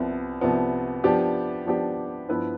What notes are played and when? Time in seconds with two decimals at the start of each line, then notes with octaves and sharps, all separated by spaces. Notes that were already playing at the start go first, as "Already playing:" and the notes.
Already playing: C2 C3 F3 B3
0.41 C2 C3 F3 B3
1.04 F3 B3 D4 G4
1.66 F3 B3 D4 G4
2.29 G2 F3 B3 E4 B4